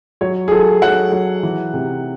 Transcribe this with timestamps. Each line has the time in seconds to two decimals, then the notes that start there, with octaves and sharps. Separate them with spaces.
0.21 F#3 C#5
0.48 G#4
0.51 F#3 A4
0.82 F#3 F#5
1.12 F#3
1.43 E3
1.74 C3